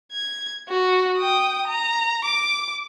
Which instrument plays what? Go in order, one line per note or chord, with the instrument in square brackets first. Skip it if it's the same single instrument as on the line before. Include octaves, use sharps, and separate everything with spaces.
[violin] G#6
F#4
G5 D#6
A#5
D6